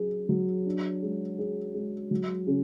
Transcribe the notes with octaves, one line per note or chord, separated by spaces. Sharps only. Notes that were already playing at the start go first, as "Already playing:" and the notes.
Already playing: F#3 C#4 G#4
F#3
D4
G#3
G#4
G#3
F#3
C#3